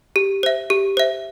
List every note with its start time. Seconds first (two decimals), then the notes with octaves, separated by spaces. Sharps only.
0.16 G4
0.43 C5 E5
0.70 G4
0.97 C5 E5